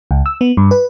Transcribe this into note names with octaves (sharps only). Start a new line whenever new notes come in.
C#2
E6
B3
G2
B4